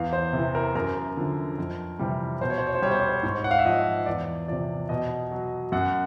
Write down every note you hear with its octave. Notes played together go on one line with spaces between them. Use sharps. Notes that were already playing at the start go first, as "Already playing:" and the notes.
Already playing: E2 F5
C5
C3 E3
A#4
F#2 A#4
D3 F3
F2
C3 E3 G3
B2 C5
C#5
C5
C#5
C5
G3 C#5
C5
C#5
C5
G#2 C#5
F#5
F5
E5
F3 D#5
E2 D5
C3 F3 D5
B2 D#5
F#3
F#2 F#5